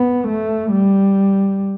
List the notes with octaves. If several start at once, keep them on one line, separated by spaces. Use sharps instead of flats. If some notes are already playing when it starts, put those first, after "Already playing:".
Already playing: B3
A3
G3